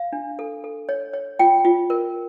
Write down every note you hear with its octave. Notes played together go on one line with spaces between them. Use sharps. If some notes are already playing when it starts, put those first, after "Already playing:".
Already playing: F5
D4
A4
A4
C#5
C#5
F4 G5
F4
A#4